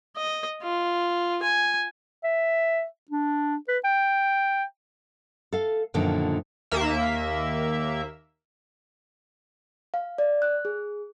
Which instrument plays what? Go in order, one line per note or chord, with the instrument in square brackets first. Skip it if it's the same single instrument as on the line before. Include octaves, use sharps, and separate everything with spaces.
[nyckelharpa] D#5
F4
G#5
[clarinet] E5
D4
B4
G5
[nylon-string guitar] A4 F5
F#2 A#2 D3 D#3 F3
[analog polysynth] D#2 A#3 E5
[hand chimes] F5
D5
F#6
G#4